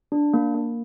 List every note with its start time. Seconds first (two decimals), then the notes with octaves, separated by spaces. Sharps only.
0.12 D4
0.34 A#3
0.54 A#3